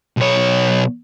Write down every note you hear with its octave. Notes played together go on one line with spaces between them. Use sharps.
B1 C#5